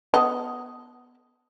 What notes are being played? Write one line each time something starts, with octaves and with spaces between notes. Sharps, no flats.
B3 A4 D#5